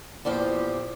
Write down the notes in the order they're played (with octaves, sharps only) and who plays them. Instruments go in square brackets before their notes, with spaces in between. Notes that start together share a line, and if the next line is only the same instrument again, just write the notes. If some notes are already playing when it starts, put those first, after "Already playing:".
[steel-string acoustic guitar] E2 A#2 F3 G4